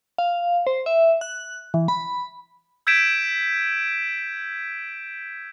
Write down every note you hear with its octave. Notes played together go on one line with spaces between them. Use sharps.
F5
C5
E5
F#6
E3
B5
E6 G6 G#6 B6 D7 E7